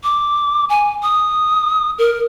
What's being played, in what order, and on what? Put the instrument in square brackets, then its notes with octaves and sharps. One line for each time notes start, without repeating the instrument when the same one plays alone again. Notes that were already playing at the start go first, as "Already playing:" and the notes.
[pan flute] D6
G#5
D#6
A#4